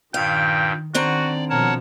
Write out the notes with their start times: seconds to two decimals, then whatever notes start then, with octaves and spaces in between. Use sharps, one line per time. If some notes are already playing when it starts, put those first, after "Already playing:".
0.14 G2 A#2 D#3 F5 G5
0.94 D3 D#3 C4 F#4 D5 A#5
1.50 B2 F3 A#4 C#5 F#5 A5